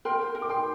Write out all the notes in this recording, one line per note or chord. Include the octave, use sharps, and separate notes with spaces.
A#4 G5 C6
A#4
D6
G5 C6